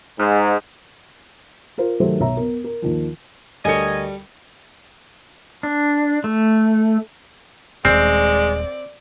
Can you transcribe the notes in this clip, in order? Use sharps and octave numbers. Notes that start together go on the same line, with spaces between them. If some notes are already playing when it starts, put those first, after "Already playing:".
G#2
F4 A#4 C5
D#3 F#3 A3 G4 A4 C5
B1 C#5 E5 A#5
B3 A#4
A#4
D#2 D#3 F3
D2 G3 A4 A#4 C#5 D#5 G#5 C#7
D4
A3
D#1 G#3 C4 D5